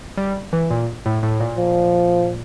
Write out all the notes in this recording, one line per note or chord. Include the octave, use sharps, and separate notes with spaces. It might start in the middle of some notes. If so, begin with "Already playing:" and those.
G3
E3
A#2
A2
A2
A#2
F3